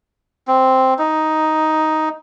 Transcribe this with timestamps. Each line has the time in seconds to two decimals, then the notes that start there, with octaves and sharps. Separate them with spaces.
0.48 C4
0.99 D#4